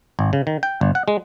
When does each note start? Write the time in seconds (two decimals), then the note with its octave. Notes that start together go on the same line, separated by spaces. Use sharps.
0.19 G#1
0.33 C#3
0.47 D#3
0.63 G5
0.81 G1
0.95 F#5
1.08 G#3